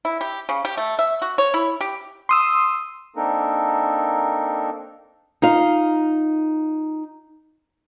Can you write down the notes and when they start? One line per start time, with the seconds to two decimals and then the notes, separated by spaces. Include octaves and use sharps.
0.05 E4
0.21 G4
0.49 C#3
0.65 G4
0.77 A3
0.99 E5
1.22 F#4
1.38 C#5
1.54 E4
1.81 G4
2.29 C6 D#6 E6
3.16 A#3 C4 D4 D#4 A4 A#4
5.42 D#4 F4 F5